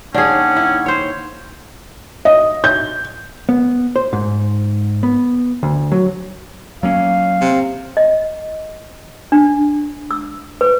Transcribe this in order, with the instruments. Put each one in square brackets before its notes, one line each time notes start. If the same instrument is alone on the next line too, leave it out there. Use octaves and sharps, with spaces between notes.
[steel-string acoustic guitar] D#2 [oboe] C#4 [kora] D4 G#4 [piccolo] F#5
[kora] E4
C5 C#5
[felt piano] D#5
G6
[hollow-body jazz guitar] B3
C5
G#2
B3
D2
F#3
[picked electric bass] F#3 A#3 C#4 [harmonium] F5
[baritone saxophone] C3
[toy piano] D#5
D4
E6
B4